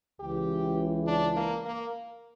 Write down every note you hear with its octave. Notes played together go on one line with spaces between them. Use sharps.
C#2 C#3 E3 G4
D4
A#3
A#3